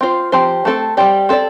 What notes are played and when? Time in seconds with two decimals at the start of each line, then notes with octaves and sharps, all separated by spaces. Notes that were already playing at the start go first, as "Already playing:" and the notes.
0.01 C4 F4 C5
0.32 F3 C4 G4 C5
0.65 A3 C4 A4
0.97 G3 C4 G4 D5
1.29 C4 A4 D5